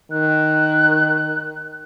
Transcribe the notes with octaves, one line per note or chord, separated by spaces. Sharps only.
D#3 F#6